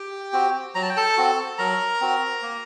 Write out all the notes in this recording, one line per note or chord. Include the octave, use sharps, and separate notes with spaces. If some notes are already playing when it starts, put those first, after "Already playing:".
Already playing: G4 G5
C4 F#4
F#3 A#5
A5
G5
A4 A5
C4 F#4
F#3 A#4 A#5
C4 F#4
A#3